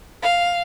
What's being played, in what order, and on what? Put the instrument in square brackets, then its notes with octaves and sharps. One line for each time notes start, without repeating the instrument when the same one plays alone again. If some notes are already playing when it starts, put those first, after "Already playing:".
[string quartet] F5